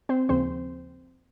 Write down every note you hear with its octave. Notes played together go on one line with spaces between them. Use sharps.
C4 C5
D#2 C#3 F3 C4 C5